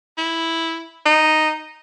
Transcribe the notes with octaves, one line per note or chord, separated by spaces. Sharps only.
E4
D#4